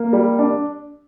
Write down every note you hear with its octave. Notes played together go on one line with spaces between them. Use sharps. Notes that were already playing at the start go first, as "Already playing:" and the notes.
Already playing: A#3
G3
D4